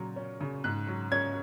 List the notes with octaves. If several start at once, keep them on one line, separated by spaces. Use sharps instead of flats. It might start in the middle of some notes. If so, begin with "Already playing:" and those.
Already playing: A#2 C#3 F#3
C#4
C#3
G#2 F#6
F#3
C#4 G#6